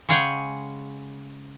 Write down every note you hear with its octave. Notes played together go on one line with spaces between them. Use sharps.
C#3 G#3 G#4 C#5 F#5 G5